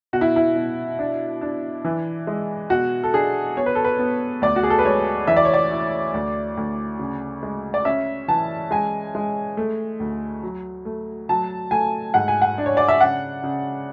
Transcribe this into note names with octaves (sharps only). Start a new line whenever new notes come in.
B2 F#4
E4
E4
B2
D4
D4
E3
G#3
B2 F#4
A4
D4 G#4
B3 C#5
B4
A4
B4
B3
D2 D5
F#4
G#4
A4
B4
G#3 C#5
E3 E5
D5
C#5
D5
E4
D2
D2
C#3
G#3
D5
C#4 E5
E3 A5
G#3 G#5
G#3
A3
D2
F#3
A3
F#3 A5
A3 G#5
G#2 F#5
G#5
F#5
D4
C#5
D5
E5
C#3 F#5
C#3